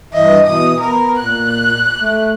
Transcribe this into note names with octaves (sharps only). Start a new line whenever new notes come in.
G2 E3 D#5 E5
B2 E3 D#6
B3 A#4
A#2 F#6
A3